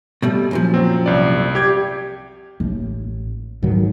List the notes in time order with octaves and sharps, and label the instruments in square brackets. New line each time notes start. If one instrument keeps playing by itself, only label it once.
[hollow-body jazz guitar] B2 G3 A3
F#2 A#2 F3
[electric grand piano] F#3 C4
C2 D5
G4 G#6
[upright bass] A1
[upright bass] F2 [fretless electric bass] G#2 D#3 F#3